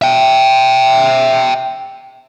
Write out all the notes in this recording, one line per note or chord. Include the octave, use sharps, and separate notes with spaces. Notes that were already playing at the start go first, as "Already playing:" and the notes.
E5 G5